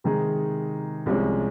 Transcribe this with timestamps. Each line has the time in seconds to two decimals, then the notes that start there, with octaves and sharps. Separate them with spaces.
0.04 C3 D#3 G#3 D#4 G#4
1.06 C2 C3 F3 G#3 C#4